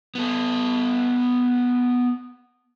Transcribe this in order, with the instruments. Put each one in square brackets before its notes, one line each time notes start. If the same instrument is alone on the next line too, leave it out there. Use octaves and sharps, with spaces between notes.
[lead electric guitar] B3 A4